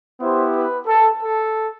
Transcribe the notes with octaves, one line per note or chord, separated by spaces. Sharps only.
B3 E4 G4 C5
B4
A4
A4